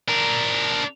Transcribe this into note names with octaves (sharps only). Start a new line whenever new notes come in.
D4 A#4